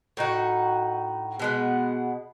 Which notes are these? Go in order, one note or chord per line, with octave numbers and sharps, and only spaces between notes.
A2 D#4 F#4
B2 G#3 B3